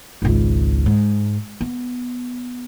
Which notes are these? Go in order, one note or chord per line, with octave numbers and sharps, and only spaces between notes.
G#1 C#2
G#2
B3